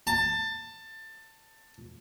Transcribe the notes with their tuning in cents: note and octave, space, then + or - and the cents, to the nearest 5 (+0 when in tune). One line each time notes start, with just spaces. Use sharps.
A5 +20